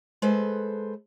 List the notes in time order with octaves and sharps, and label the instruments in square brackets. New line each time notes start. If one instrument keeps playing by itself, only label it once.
[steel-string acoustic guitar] G#3 A4 B4 C5